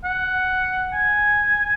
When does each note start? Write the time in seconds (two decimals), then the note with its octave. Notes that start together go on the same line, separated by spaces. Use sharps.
0.04 F#5
0.93 G#5